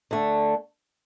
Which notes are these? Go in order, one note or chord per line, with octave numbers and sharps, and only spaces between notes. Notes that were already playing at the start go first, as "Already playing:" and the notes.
D3 A3